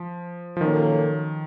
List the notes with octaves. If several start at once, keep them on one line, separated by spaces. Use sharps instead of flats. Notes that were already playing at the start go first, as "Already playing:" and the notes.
Already playing: F3
F3
A#2 D#3 F#3 A#3 C#4 A4